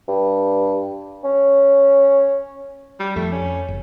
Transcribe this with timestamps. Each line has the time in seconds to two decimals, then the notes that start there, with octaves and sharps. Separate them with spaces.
0.08 G2
1.24 C#4
3.00 G3
3.16 F2 A3
3.32 C#4
3.68 F#1